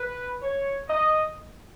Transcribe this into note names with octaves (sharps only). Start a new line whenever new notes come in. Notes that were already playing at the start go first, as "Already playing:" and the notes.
Already playing: B4
C#5
D#5